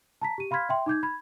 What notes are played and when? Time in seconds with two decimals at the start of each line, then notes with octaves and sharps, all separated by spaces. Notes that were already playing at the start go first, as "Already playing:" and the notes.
0.22 A5 A#5 B6
0.38 G4 D#7
0.51 F5 B5 C6 F6 G#6 B6
0.69 E5 G5 C6
0.86 D#4 D6 G6 G#6
1.03 B5 G#6